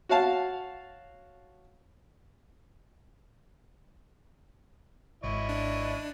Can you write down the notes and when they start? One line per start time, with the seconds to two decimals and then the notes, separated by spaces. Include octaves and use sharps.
0.09 F#4 C#5 F5 A5
5.24 G#1 E4 C#5 D#5
5.49 D4